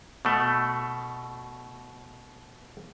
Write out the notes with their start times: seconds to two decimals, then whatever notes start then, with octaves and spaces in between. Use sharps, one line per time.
0.25 B2 A3